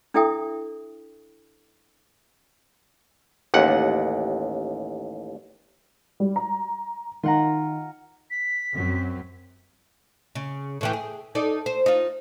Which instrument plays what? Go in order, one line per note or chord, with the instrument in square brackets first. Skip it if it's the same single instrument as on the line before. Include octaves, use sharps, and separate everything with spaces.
[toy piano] D4 E4 A4 E5 G5 D#6
[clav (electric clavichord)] A1 D#2 F#5
[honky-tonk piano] G3
A#5
[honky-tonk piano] D#3 [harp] F4 F#5 A#5
[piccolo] B6
[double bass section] F#2 F#3 C4
[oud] C#3
A2 E3 G4
G#4
D#4 A4 D5
C5
D#4 F4